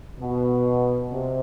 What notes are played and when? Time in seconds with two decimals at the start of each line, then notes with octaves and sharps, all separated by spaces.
0.19 B2
1.12 C3